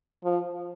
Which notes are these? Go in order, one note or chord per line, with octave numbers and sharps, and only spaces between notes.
F3